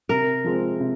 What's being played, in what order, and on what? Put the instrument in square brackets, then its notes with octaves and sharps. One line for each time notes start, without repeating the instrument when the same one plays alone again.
[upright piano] C3 [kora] A#4
[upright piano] F3 G#3 C4
C3